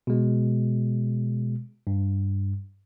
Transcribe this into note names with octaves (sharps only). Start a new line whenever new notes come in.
B2 G#3
G2